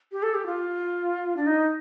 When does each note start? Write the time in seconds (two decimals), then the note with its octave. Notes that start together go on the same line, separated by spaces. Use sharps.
0.12 G4
0.23 A4
0.35 G4
0.46 F4
1.37 D4
1.47 D#4